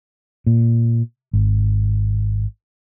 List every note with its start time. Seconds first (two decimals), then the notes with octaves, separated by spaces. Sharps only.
0.46 A#2
1.33 G#1